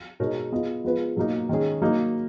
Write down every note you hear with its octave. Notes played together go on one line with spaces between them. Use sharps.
B2 G#3 D#4 A#4 C#5
B3 F4 G#4 D#5
F3 G#3 B3 F4 B4
B2 F#3 A#3 D#4
D#3 G#3 C#4 G#4
F#3 A#3 D#4